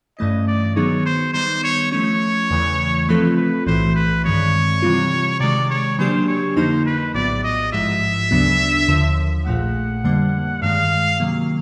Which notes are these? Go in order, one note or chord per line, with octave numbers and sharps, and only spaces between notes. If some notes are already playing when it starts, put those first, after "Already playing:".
G2 E3 A3 C#4 D#5
D5
D#3 F#3 B3 D#4 G#4 C#5
C5
D#3 G3 B3 D#4 C5
C#5
F3 A3 C#4 C#5
E2 C#3 E3 A3
F3 A3 C4 F4 A4 B4
B4
B1 A2 E3 A3 C5
B4
G2 D#3 G#3 C4 C#5
C3 E3 G3 C4 F4
C3 D#3 G#3 D5
C#5
C#3 F#3 A#3 D4 G4 C5
C#5
F2 D3 F3 A#3 D#4 C5
B4
A#1 A2 F#3 B3 D5
D#5
A1 G#2 F3 G#3 E5
D2 C#3 F#3 B3 D4
D#2 D3 F3
A#1 A#2 F3 A3 F#5
F2 D3 G3 A#3
G2 D#3 G#3 F5
C3 D#3 F#3 A#3